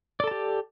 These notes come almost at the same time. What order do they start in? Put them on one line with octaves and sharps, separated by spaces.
D5 A4 A5 G4